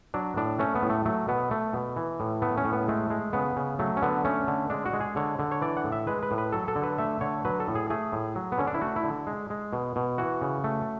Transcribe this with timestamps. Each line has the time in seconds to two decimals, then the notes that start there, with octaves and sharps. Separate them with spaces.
0.14 F#3 D4
0.36 A2 D4
0.59 A3 C#4
0.75 B3
0.82 A2
0.90 A3
1.06 F#3 A3
1.28 B2 B3
1.51 A3
1.73 B2
1.96 E3
2.20 A2
2.42 A3 B3
2.57 C#4
2.65 A2
2.73 B3
2.88 G#3 A3
3.10 G#3
3.33 C#3 B3
3.56 C#3
3.79 F#3 A3
3.97 C#4
4.02 D3 B3
4.25 A3 C#4
4.48 D3
4.70 G#3 D4
4.86 F#4
4.93 G#3
5.01 G#4
5.16 D3 C#5
5.39 D3
5.51 C#5
5.62 E3 D5
5.77 F#5
5.84 A2
5.92 E5
6.07 G#3 B4
6.23 B4
6.31 A2
6.38 B4
6.52 F#3 A4
6.68 A4
6.76 D3
6.83 B4
6.98 A3 E5
7.21 D3 C#5
7.45 F#3 B4
7.60 A4
7.68 A2
7.75 G#4
7.90 A3 G#4
8.12 A2
8.36 F#3
8.52 B3
8.58 D3 C#4
8.67 D4
8.74 E4
8.81 A3 F#4
8.96 E4
9.04 D3
9.27 G#3
9.50 G#3
9.73 B2
9.96 B2
10.18 E3 F#4
10.42 C#3
10.64 A3